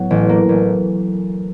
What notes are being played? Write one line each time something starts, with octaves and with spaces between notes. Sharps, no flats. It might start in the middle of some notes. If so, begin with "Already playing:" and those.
Already playing: A2 F#3 B3
A1
A#3
A1